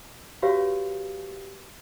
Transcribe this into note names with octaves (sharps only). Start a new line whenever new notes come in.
F#4 G4 B4 C#5 F5